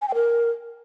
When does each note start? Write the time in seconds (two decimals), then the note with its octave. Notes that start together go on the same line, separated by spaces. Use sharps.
0.02 G#5
0.08 G5
0.15 A#4